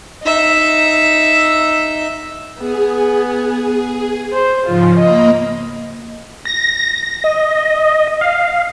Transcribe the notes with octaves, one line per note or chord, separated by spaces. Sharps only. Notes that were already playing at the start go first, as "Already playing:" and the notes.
D#4 E5
B3 G#4
C5
G#2 C#3 F3 F4
A#3 D#5 A#5 B5
A#6
D#5
F5